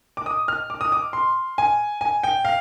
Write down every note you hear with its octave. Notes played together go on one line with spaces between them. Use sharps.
D6
D#6
F6
D6
D#6
D6
C6
G#5
G#5
G5
F5